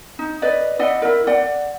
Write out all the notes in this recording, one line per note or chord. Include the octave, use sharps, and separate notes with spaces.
D#4
B4 D5 D#5
E4 D5 D#5 F#5
E4 A#4
D5 F#5